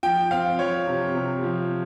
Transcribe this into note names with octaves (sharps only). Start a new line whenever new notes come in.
F3 G5
C4 F5
F3 C#5
C3
C3
F3